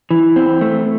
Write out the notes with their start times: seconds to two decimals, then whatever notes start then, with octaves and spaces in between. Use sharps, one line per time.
0.11 E3
0.36 C4
0.61 A3